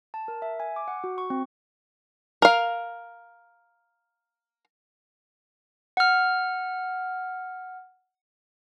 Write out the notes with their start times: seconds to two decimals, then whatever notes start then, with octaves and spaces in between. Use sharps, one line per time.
0.14 A5
0.28 A#4
0.42 E5
0.60 G#5
0.76 D6
0.88 F#5
1.04 F#4
1.18 C#6
1.30 C4
2.42 A#4 F5
5.97 F#5 F6